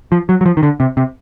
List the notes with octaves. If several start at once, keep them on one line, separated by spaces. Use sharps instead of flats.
F3
F#3
F#3
F3
D#3
D3
C3
C3